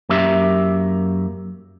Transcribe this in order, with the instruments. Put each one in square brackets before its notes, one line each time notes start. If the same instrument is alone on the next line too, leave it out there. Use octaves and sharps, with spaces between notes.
[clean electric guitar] F#2 A#3 G4 E5